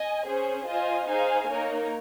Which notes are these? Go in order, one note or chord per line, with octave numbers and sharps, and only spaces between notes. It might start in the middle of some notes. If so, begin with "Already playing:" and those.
Already playing: D#5 G#5
C#4 G#4 C5
F4 C5 D#5 G#5
D#4 G#4 C5 F5 G#5
A#3 D#4 A#4 C#5